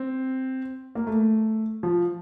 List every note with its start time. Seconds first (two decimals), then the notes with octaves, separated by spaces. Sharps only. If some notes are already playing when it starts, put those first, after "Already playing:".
Already playing: C4
0.95 A#3
1.07 A3
1.83 F3